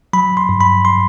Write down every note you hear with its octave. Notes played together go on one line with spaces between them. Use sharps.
F#3 B5
C6
G2
B5
C6